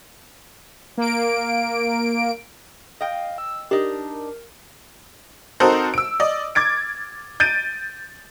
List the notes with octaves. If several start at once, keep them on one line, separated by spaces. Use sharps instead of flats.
A#3 D7
D#5 F5 G5
E6
D4 D#4 G4 A#4
C4 D#4 F#4 A4 A#4 C5
E6 D7
D5 D#5
D6 G#6 A6 D7
G6 A6 D7 D#7